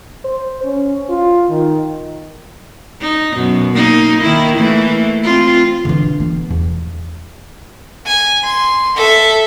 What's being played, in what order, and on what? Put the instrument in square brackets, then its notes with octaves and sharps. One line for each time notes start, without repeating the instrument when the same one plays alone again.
[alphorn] C5
C#4
F4
D#3
[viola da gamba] D#4
F#2 B2
A#3 D#4
D#3 A#3 E4
E3 A3 A#3
C4 F4
[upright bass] D3 E3
B3
E2
[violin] G#5
C6
A4 E5